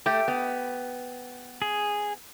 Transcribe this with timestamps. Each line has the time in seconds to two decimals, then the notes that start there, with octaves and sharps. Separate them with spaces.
0.06 A3 G4
0.28 B3
1.62 G#4